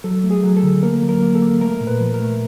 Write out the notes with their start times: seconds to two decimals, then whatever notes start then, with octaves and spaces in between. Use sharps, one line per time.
0.04 F#3 A4
0.24 A3
0.31 G#4
0.44 F#3
0.57 A4
0.63 D3
0.83 A#3 A#4
1.03 F#3
1.09 A#4
1.22 A#3
1.35 A4
1.42 A#3
1.61 A3 A#4
1.81 A#2
1.87 B4
2.01 F3
2.14 A#4
2.20 A3